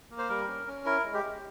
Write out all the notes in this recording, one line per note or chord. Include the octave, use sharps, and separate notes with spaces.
A#3
C5
G3 A#4
C#4
C#4
E4 A#4
G#3
G4
G#3